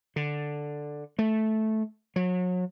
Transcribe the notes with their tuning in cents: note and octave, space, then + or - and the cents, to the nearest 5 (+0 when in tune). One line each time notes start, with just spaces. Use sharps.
D3 +5
A3 -10
F#3 -35